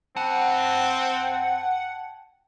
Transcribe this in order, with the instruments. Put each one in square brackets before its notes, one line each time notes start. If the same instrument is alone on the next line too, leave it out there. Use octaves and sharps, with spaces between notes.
[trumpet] C4 [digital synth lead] F#5 [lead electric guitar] G5 A5